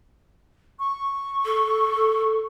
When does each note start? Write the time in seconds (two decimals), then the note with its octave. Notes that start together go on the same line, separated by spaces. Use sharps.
0.79 C#6
1.45 A4